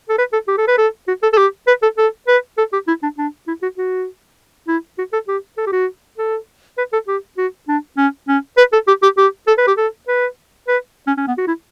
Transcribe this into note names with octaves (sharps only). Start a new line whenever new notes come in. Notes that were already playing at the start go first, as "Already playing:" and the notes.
A4
B4
A4
G4
A4
B4
A4
F#4
A4
A4
G4
B4
A4
A4
B4
A4
G4
E4
D4
D4
E4
F#4
F#4
E4
F#4
A4
G4
A4
G4
F#4
A4
B4
A4
G4
F#4
D4
C#4
C#4
B4
A4
G4
G4
G4
A4
B4
G4
A4
B4
B4
C#4
C#4
B3
F#4
E4